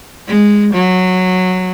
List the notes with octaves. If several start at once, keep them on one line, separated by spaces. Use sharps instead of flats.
G#3
F#3